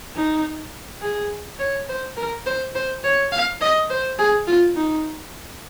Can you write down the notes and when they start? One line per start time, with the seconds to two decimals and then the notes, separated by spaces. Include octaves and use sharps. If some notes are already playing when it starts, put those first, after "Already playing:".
0.16 D#4
1.02 G#4
1.59 C#5
1.89 C5
2.17 A#4
2.46 C5
2.75 C5
3.04 C#5
3.32 F5
3.61 D#5
3.90 C5
4.18 G#4
4.47 F4
4.76 D#4